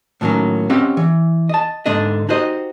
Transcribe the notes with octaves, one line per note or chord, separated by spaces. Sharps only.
A2 D#3 F#3 A#3 C#4
C4 C#4 G4 D#5 F5 F#5
E3
D#5 A5
G#2 D3 D4 D#5
D#4 F#4 G4 C5 D#5